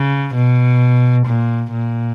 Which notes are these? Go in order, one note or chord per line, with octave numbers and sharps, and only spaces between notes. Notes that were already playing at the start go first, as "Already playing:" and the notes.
Already playing: C#3
B2
A#2
A#2